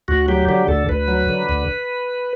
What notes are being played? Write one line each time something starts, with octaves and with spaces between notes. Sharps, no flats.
D2 F#4
F#3 G4
D3 G4
D2 A4
D2 B4
F#3
D3
D2